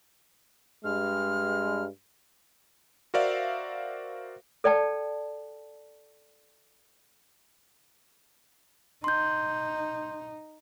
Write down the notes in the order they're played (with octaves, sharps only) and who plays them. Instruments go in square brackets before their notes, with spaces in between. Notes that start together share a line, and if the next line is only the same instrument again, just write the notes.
[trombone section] G2 G#3 [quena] F6
[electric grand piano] F#4 A#4 C5 D5 E5 F5
[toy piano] A4 D5 G5 A5
[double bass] D#4 [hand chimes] C6 G6